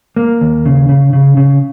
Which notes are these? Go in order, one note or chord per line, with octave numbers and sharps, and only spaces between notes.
A#3
D#2
C#3
C#3
C#3
C#3